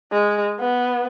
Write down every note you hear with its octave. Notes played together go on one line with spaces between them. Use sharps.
G#3
B3